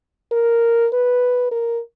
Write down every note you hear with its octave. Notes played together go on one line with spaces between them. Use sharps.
A#4
B4
A#4